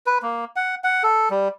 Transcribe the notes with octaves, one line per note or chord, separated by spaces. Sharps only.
B4
A#3
F#5
F#5
A4
G3